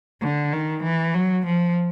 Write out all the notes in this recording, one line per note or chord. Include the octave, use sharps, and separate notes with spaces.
D3
D#3
E3
F#3
F3